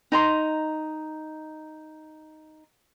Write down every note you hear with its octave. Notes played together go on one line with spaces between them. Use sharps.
D#4 A#5 C6